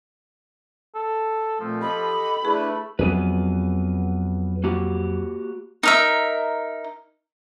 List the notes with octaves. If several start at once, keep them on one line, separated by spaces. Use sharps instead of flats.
A4
A#2 F3 A3 C4
G4 A4 D#5 B5
A3 D4 E4 G#4 B4
F2 F#3 B3 G#4 B4
A#3 F#4 G4
D#4 A#4 E5